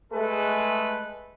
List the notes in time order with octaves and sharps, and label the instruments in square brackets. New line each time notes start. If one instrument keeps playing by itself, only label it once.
[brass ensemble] G#3 A3 G#4 A4 B4